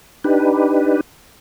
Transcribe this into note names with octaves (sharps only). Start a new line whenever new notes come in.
D4 D#4 G4 B4